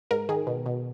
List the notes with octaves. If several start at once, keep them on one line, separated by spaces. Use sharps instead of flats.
G#2 A#4
D#3 G#4
B2
B2